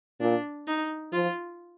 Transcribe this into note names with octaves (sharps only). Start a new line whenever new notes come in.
A#2 D4
D#4
F3 F4